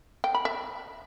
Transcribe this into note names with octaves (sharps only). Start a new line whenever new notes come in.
G5
B5
E5